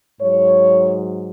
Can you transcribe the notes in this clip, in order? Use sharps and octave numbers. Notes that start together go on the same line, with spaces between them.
G#2 F#3 C#5